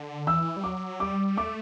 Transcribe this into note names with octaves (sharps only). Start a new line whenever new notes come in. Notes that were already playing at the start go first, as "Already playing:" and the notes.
Already playing: D3
E3 E6
G3
F#3 D6
G3 D6
A3 D6